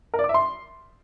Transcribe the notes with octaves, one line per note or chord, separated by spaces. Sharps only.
A#4
D5
D6
E5
C6